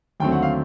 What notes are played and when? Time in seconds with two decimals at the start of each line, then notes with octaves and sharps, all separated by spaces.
0.20 D#2 D3 F#3 A3 C4 G5
0.32 F#5
0.42 F5